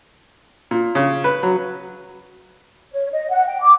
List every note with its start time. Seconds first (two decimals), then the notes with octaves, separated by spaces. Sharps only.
0.71 A#2
0.95 C#3
1.24 B4
1.43 F#3
2.93 C#5
3.11 D#5
3.30 F#5
3.47 G5
3.62 D6